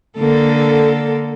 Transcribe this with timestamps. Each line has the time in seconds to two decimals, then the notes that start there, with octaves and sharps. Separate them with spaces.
0.18 D3 A#3 A4